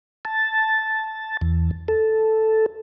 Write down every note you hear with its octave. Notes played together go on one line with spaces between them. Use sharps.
A5
E2
A4